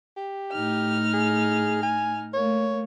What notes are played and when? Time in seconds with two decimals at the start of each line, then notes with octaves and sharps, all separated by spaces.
0.17 G4
0.52 A2 D#4 F6
1.14 G#4
1.83 G#5
2.33 A3 A#3 C#5